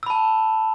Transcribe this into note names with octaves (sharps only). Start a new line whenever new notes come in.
A5 B5 E6